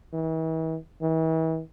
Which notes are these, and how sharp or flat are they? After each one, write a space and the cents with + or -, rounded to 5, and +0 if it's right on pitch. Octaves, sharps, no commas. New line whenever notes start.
E3 -40
E3 -40